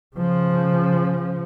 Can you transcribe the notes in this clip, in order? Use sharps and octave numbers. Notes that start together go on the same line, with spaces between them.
C#3 F3